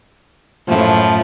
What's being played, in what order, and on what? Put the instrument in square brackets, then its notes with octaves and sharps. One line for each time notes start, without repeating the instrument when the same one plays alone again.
[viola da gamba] F#2 A2 A3 [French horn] F3